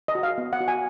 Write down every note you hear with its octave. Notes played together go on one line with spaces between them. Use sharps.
D#5
F#4
F5
B3
F#5
F#4
G#5